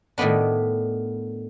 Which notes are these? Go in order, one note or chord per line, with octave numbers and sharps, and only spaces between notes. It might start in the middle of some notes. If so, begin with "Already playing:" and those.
A2 D#3 A3 B3 D4